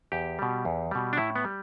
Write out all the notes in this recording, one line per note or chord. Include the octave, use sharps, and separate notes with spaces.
E2 G4
B2 G3
E2
B2 G3
D4
A2 E4
B3
G3